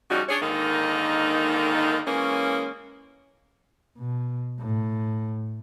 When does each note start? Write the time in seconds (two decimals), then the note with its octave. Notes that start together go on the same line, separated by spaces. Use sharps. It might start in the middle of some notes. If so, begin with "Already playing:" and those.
0.10 C#3 F3 G3 C#4 D#4 F#4
0.29 C#4 D4 G#4 C#5
0.41 G#2 D3 D#3 A#3 D#4
2.07 E3 G#3 A#3 C#4
3.98 B2
4.60 A2